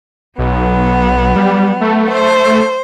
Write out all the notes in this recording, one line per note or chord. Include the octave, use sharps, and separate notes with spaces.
B1 F#3 B3
G3
A3
C5